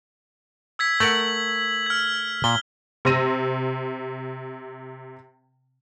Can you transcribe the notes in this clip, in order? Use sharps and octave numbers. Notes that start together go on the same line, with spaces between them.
E6 G#6 B6
A3 A#4 F#5 F#7
F6 G#6
A#2 G7
C3 C6 E6 A#6 D#7